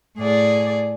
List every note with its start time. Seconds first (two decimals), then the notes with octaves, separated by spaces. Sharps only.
0.17 A2 G#4 D5